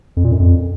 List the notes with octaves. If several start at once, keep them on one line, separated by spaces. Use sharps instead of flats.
F2
A#2
F#2
F2